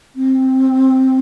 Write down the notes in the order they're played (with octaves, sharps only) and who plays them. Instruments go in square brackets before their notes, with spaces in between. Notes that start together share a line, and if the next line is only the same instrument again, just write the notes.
[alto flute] C4